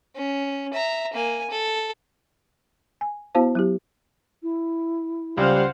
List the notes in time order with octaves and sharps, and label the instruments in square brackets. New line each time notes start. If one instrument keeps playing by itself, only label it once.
[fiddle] C#4
E5 A#5
A#3 G#5
A4
[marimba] G#5
B3 E4 F#4 C5 F5 A5
F#3 E4 G4
[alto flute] E4
[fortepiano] C#2 [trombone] G3 [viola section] C5 F5 F#5